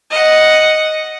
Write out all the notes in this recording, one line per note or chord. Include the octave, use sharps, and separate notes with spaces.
D#5 F#5